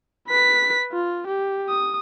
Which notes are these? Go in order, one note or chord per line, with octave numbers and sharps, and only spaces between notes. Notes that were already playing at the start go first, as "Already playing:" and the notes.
B4 B6
F4
G4
D#6